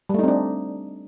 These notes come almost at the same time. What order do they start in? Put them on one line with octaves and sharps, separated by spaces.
G3 A3 D#4 C4 D4